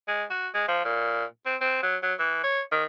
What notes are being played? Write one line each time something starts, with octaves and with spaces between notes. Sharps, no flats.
G#3
F#4
G#3
F3
A#2
C4
C4
F#3
F#3
E3
C#5
D#3